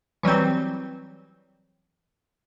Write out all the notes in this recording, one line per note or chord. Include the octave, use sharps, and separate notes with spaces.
E3 F#3 G3 C4